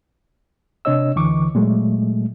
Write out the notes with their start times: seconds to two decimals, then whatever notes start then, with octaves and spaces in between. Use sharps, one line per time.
0.85 C3 D4 C#5 D#5 E6
1.16 D2 D3 E3 C#6 D6
1.55 A#2 F#3 G#3 A3